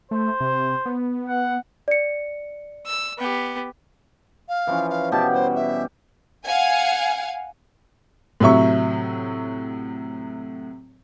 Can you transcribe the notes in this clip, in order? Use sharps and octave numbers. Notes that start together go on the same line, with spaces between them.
A3 C5
C3
B3
F#5
D5 C#7
E6
B3 G4
F5
E3 F3 C#4
F5
B2 G4 A5
G3 C5
E5
F5 F#5 G#5
A2 C3 F#3 E5 C#6